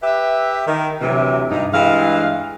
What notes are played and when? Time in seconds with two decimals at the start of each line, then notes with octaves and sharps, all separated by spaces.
0.03 G4 B4 E5
0.67 D#3
1.01 D2 C3 E3 F#3 E5
1.50 G2 D#4
1.73 G2 E3 G#3 F5